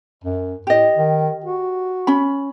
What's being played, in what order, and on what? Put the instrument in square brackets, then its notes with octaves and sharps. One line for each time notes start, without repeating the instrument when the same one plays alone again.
[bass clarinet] F#2
[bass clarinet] A2 [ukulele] G4 D#5
[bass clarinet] D#3
F#4
[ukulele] C#4 B5